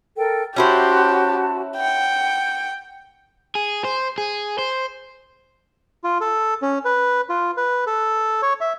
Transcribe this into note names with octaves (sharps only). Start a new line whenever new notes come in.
A4 A#4 G5
C#4 E4 F#4 G4 C5 A5
F#5 G5
G#4
C5
G#4
C5
F4
A4
C#4
B4
F4
B4
A4
C#5
E5